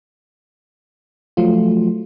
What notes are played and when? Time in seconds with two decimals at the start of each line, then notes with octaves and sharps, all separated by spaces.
1.37 F3 F#3 A3 F4